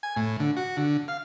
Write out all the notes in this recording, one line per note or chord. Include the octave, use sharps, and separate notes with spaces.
G#5
A2
D3
F#4
D3
F5